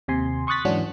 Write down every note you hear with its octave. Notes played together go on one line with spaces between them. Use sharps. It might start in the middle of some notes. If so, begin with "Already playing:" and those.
D#2 C3 G#5 C6
C6 C#6 D#6 F#6 A6 B6
G#2 E3 F#3 C#4 D4 F#4